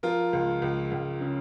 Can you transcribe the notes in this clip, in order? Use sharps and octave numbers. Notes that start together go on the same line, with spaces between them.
F3 F4 A#4
C#2
C#2
C#2
C#3